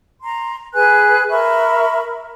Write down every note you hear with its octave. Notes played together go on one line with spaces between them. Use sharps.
A#5 C6
G#4 B4 G#5 F#6
A#4 E5 B5 C#6